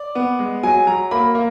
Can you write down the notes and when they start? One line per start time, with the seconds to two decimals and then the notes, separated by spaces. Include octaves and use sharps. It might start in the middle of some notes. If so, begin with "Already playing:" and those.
Already playing: D5
0.15 B3
0.39 G#3
0.63 F#3 G#5
0.87 F#3 A#5
1.11 A#3 B5
1.35 A#3